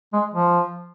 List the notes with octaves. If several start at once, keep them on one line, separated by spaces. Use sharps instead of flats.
G#3
F3